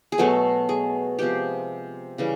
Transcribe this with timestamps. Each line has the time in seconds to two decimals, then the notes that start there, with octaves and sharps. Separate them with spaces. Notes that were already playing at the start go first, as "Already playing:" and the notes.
0.12 G#4
0.18 B2 F#3 A3 A4
0.69 G#4
1.19 C3 F3 G#3 B3 G4
2.18 C#3 E3 G3